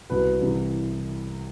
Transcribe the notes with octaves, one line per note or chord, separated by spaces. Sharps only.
C2 B2 B4
C2 C3 E3